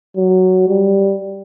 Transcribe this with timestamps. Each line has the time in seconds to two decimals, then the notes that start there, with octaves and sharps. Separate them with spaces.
0.17 F#3
0.69 G3